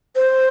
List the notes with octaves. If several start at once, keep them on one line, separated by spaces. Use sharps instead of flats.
C5